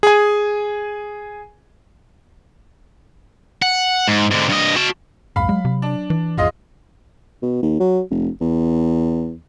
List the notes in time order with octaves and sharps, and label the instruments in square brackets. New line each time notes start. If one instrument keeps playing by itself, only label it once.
[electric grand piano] G#4 G#5
[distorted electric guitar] F#5
G#2
G#2 D3
G2 D#5
F#4 A5
[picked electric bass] B1 F2 G#2 [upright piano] F5 B5
[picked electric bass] F#3 [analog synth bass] G#3
[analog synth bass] C3
[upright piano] D4
[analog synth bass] E3
[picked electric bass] G#1 E2 [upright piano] G#3 F4 D#5
[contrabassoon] B2
D#2
F#3
F1
E2